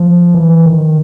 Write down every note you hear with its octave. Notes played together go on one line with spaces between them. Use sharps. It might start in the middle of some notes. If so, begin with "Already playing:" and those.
Already playing: F3
E3
D#3